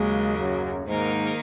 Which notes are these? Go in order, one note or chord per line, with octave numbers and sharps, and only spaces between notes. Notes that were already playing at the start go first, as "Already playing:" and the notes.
Already playing: D#2 C#3 F#3 G#3 A#3
F#2
G#2 D#3 A#3 D#4 A#4